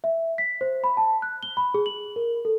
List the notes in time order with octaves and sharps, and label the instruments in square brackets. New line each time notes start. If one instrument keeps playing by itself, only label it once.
[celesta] E5
B6
C5
B5
A5
F#6
G7
B5
G#4
F#7
A#4
A4